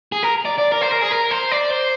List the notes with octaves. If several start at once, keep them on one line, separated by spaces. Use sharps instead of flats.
G#4
A#4
D5
D5
A#4
C5
A#4
G#4
A#4
C5
D5
C5